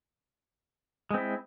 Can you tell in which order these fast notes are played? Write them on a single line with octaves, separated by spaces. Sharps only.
G#3 C4 E4